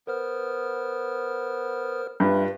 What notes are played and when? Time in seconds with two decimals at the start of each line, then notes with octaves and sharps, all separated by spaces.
0.07 B3 A#4 C5 F6
2.20 G2 F4 B4 E5